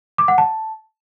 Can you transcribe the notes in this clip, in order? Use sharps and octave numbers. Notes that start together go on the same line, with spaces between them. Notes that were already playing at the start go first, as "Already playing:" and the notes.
D6
F#5
A5